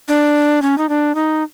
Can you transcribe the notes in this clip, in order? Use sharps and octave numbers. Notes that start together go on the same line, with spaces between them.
D4
C#4
D#4
D4
D#4